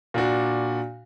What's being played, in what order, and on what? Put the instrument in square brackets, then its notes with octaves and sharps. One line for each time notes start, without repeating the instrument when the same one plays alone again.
[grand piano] A#2 D4 F#4